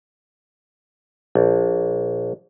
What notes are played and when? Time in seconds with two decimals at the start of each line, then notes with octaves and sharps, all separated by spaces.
1.35 A#1